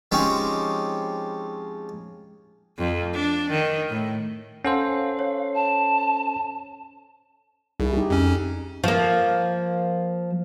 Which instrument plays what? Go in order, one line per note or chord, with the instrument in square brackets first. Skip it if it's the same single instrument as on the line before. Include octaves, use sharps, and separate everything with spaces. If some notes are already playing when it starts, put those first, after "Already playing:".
[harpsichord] F3 G#3 C4 C#4 D#4 G4
[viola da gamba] F2
D4
D#3
A2
[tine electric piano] C#4 A4 C5 [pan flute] F5 [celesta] F#5
[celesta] C#5
[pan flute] A5
[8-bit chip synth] C2 [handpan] D#4 E4 G#4
[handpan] D#4 G4
[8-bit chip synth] F2 C#4
[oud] F3 A#3